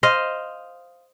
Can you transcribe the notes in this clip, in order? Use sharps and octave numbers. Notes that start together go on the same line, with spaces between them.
C5 D#5 F5